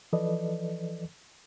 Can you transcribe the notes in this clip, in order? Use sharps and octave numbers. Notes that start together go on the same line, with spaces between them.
E3 F3 A4 B4 D5 D#5